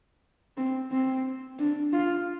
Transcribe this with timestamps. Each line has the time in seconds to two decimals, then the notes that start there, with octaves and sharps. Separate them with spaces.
0.57 C4
0.91 C4
1.59 D4
1.93 F4